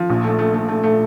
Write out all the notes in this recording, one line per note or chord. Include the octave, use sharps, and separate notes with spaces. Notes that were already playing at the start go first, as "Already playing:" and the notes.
Already playing: F3
A#1
A3
A3
A3
A3
A3